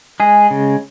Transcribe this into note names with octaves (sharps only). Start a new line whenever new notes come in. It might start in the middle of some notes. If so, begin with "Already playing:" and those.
G#3 G#4
C#3